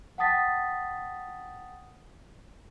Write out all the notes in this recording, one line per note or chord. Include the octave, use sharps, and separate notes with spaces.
F#5 G5 A5 D#6 A6 B6